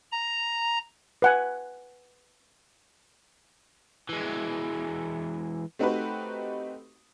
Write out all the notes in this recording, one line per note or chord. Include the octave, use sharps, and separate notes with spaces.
A#5
B4 F#5 G#5
E3 G#3
A3 C4 D#4 F#4 G4 B4